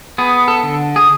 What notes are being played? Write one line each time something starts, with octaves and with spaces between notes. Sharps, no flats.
B3 G#4
A4
D3
G#4